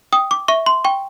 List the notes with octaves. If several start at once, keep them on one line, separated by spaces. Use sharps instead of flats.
G5 D#6
D6
E5 C#6
C6
G5 C#6